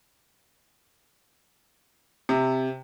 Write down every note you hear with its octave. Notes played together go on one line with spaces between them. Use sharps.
C3